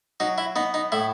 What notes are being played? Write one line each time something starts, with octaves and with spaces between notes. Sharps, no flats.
F#3 D#4
E4
B3 D#4
D#4
A2 E4